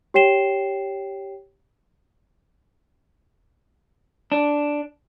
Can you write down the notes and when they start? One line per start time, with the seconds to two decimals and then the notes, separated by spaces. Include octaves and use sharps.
0.14 G4 C#5 G5 C7 E7 G7
4.32 D4